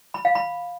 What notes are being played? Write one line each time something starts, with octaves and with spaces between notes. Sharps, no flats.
B5
F5
B5